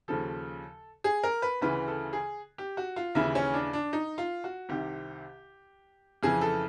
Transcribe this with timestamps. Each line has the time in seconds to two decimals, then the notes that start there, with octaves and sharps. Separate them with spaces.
0.08 D#2 C#3 F3 A4
1.04 G#4
1.24 A#4
1.42 B4
1.61 D2 C#3 E3 B4
1.88 A4
2.13 G#4
2.58 G4
2.77 F#4
2.96 F4
3.15 D#2 C#3 E3 E4
3.35 C#4
3.53 D4
3.73 D4
3.93 D#4
4.18 F4
4.44 F#4
4.69 C2 C3 D#3 G4
6.23 F2 C#3 E3 G#4
6.41 A4